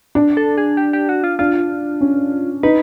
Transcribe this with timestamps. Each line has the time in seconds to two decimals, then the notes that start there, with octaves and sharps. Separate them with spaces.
0.15 D4
0.37 A4
0.58 G#4
0.77 G4
0.93 G4
1.09 F#4
1.24 F4
1.39 D4 F4
2.01 C#4
2.63 D#4 B4